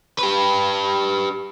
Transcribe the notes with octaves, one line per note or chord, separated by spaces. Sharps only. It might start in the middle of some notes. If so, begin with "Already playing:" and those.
G4 B4